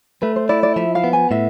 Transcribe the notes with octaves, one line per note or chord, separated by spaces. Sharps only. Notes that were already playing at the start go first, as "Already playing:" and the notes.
A3 B4
C5
E4 D5
D5
F3 E5
F5
B3
G#5
A2 E5